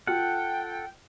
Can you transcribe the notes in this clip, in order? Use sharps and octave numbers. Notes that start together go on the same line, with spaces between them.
F4 A4 F#5 G5 F6